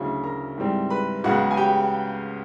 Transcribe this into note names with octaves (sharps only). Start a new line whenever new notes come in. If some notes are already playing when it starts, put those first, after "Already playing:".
Already playing: D2 C#3 F#3 E4
A#4 A#5
G#2 E3 G3 C4
B4 B5
C#2 C#3 F#3 B3 F#4 F#5
G#5
G4 G5